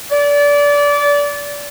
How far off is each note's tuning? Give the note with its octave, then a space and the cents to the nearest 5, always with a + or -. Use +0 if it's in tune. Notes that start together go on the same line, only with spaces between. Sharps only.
D5 -25